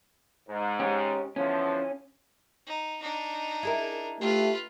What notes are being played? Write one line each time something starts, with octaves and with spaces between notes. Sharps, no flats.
G#2
C#4 G4
E2 D3 F3 C#4
D#4
D4 D#4
E4 G#4 A#4
A3 F4 G4 B4